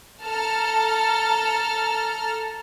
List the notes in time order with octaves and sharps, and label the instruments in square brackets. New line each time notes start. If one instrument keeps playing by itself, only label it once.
[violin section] A4 A5 A#5 F6